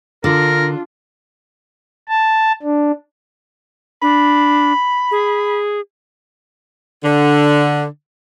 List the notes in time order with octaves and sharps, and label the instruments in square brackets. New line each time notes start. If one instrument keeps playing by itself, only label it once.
[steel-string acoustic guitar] D3 [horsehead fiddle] D4 F4 [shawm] A#4
[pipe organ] A5
D4
[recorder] D4 [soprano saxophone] B5
[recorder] G#4
[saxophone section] D3